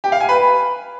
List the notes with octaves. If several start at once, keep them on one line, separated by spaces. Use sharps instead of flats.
G4
F5
G#5
B4